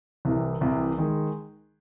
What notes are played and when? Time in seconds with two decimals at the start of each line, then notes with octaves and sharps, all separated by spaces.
0.25 C2 C3 E3
0.61 C2 C3 E3
0.98 D#3 G#3